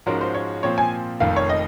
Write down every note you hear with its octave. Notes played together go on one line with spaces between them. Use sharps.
G#2 F3 G#3 C#4 F#4 A#4
C5
C#5
A#2 F3 C4 C#5
G#5
F1 F2 D#3 F5
C#5
D#5